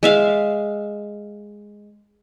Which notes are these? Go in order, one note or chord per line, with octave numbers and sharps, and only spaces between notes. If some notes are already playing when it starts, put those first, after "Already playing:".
G#3 E5 F5